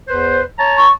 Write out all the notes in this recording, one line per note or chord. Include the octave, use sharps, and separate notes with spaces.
E2 B4 C5
C#5 A5 A#5
C#6